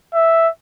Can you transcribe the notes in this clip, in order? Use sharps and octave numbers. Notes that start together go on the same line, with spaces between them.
E5